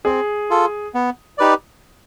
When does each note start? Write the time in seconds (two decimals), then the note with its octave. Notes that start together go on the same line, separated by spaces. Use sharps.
0.05 C4 G#4
0.50 F4 A4
0.94 B3
1.38 D#4 G4 B4 D5